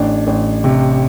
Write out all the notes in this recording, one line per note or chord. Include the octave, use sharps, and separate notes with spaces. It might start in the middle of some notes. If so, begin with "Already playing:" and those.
Already playing: A1 D4
A1
C3